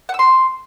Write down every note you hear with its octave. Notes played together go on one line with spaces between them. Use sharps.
F#5
E6
C6